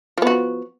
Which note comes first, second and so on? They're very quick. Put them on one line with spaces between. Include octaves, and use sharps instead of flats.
F3 B3 F#4